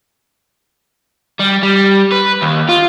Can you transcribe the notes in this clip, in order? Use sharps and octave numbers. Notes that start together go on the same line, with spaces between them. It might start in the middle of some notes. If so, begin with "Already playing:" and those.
G3
G3
B4
D#2
F4